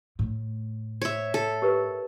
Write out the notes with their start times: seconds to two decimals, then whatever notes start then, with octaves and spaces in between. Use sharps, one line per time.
0.19 A2
1.02 C#5 E5
1.34 A4
1.62 G4 A#4 B4